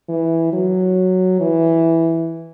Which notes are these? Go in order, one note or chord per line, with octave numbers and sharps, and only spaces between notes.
E3
F#3
E3